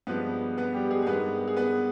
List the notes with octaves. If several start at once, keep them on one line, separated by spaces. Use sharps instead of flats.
G2 F3 G#3 B3 B4
B3 B4
G3 G4
G#3 G#4
G#4
G2 D#3 G#3 B3 B4
G#4
B3 B4